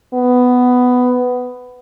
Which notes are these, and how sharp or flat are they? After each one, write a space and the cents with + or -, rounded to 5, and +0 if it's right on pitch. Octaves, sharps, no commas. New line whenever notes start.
B3 +10